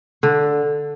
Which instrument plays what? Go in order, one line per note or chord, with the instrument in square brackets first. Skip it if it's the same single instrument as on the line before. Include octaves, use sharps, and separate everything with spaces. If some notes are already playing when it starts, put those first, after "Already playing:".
[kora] D3